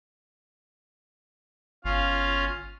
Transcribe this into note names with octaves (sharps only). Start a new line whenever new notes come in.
G1 C#4 F4 F5